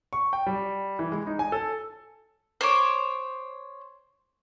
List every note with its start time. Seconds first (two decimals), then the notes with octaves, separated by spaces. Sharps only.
0.13 C#6
0.33 G5
0.46 G3
0.99 E3
1.12 G#3
1.27 D#4
1.39 G#5
1.52 A4
2.61 C5 C#5 D6